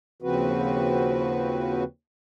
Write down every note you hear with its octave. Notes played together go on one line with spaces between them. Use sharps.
D#2 C#3 F3 C4 F#4 B4